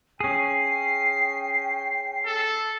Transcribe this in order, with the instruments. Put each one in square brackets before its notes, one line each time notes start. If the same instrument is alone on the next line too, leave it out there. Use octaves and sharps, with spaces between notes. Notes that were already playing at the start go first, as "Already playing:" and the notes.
[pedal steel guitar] C#4 G#4 [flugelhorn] G5 [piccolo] C7
[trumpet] A4